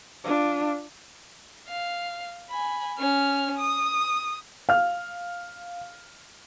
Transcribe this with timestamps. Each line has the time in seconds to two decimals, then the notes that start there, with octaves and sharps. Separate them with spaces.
0.24 D4 F4
1.68 F5
2.49 G#5 B5
2.99 C#4 F6
3.58 D#6
4.69 F5 F6